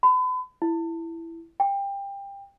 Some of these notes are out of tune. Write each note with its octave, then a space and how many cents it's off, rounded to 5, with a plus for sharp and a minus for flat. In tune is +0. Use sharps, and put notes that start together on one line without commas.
B5 +40
E4 +10
G5 +20